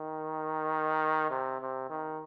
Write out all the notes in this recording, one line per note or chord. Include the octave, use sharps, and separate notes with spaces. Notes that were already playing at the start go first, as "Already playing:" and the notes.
Already playing: D#3
C3
C3
D#3